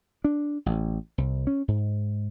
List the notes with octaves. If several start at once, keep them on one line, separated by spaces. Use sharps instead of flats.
D4
A1
C2
C#4
G#2